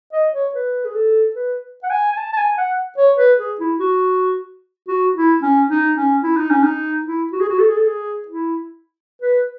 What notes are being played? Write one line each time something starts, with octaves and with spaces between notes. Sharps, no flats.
D#5
C#5
B4
G#4
A4
B4
F#5
G#5
G#5
A5
A5
G#5
F#5
C#5
B4
G#4
E4
F#4
F#4
E4
C#4
D#4
C#4
E4
D#4
C#4
D#4
E4
F#4
G#4
F#4
A4
G#4
A4
G#4
E4
B4